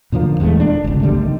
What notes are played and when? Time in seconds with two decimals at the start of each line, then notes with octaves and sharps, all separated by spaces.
0.12 A#2 D3 F3 A#3
0.40 E1 E2 G#3 A3
0.60 D4
0.84 G1 C#2
1.02 B1 D3 G3 A3
1.22 D#3